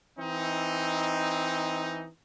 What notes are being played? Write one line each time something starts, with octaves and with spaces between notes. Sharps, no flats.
E3 C4 D#4